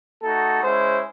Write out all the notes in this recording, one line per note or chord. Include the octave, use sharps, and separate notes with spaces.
A3 D#4 F#4 A4
G#3 C#4 E4 C5